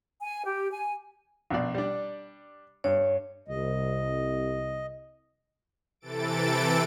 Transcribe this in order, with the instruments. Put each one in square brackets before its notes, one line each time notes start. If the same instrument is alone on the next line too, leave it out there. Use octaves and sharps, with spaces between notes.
[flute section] G#5
G4
G#5
[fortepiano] A#1 B2 D5
G3 D4
[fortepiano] G2 [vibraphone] C#5
[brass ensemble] C2 [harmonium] D#5
[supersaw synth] C3 E3 A4 A6 D7